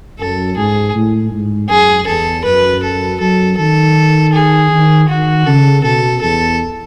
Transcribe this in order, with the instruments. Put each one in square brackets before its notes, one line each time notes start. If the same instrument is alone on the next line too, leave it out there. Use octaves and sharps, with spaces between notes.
[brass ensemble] F#2 [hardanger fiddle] A4
[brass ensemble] G#2 [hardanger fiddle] G#4
[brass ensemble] A2
G#2
[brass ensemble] F#2 [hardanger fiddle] G#4
[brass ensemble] E2 [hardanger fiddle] A4
[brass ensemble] F#2 [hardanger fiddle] B4
[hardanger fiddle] A4
[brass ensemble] F#2 [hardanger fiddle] A4
[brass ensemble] D#3 [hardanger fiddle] A4
[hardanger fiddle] G#4
[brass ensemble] D#3
[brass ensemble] D#3 [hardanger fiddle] F#4
[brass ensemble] C#3 [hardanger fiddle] A4
[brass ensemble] B2 [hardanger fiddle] A4
[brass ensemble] E2 [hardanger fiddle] A4